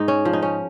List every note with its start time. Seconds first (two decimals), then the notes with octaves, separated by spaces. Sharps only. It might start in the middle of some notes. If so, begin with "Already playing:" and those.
Already playing: G#2 D#4
0.08 C#4
0.25 F3
0.33 D#4
0.42 C#4